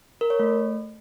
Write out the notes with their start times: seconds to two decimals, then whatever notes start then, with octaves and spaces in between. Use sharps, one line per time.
0.21 A#4
0.30 C#5
0.39 A3